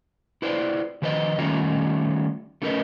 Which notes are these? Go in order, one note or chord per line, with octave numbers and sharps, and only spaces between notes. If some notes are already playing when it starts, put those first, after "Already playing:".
E4 B4 C5 D5
D#3 F3 B4 C5 D#5
D#3 G3 A3 C#4 D#4 F4
A3 C#4 D#4 A#4 B4 D#5